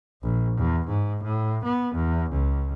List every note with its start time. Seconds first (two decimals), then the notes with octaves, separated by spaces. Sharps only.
0.22 A#1
0.57 E2
0.88 G#2
1.24 A2
1.64 B3
1.95 E2
2.31 C#2